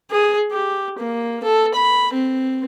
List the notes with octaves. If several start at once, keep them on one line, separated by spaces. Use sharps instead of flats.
G#4
G4
A#3
A4
B5
C4